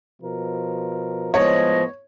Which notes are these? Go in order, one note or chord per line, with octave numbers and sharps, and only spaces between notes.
B2 F3 A#4
A2 F3 G#3 B3 C#5 D#5